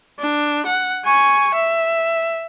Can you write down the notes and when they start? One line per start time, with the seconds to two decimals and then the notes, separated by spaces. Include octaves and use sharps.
0.19 D4
0.66 F#5
1.05 G#5 C#6
1.54 E5